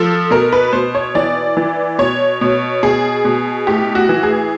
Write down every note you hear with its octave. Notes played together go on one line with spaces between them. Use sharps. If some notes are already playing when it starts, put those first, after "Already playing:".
Already playing: F3 A4
B2 A#4
B4
B2 C5
C#5
E3 D5
E3
B2 C#5
B2
B2 G#4
B2
A2 G4
F#4
E3
G#4